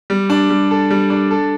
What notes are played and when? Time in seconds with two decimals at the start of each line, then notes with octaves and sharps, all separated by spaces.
0.10 G3
0.30 D4
0.50 G3
0.71 A4
0.90 G3
1.10 D4
1.31 A4